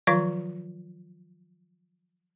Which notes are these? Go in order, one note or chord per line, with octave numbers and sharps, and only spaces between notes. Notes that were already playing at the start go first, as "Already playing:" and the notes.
D#3 F3 F#3 F4 F5 C#6